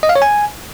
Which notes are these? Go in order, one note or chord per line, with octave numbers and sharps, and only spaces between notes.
D#5
F5
C#5
G#5